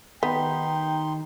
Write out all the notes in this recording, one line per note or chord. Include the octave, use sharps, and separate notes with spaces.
D#3 B3 D#4 G4 G5 B5 C6